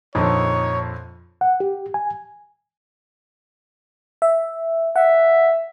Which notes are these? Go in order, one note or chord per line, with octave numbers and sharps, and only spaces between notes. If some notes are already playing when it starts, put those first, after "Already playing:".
A#1 F2 D3 D#4 C#5
F#5
G4
G#5
E5
E5 F#5